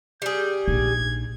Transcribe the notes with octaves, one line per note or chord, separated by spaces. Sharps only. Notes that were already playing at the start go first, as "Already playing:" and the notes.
G3 G#4 G6
A#1 D#4 G#6